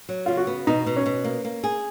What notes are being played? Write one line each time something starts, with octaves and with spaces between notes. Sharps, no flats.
F#3
C#3 F4
F#4
B3
B2 D#4
B2
C#4
B2
A#3
A#3
G#4